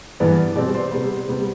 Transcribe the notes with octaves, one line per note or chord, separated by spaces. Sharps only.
G2 E3 B3 D5
B2 G3 C4 D5
C5
C3 G3 B3
C3 G3 B3